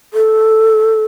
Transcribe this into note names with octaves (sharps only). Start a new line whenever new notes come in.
A4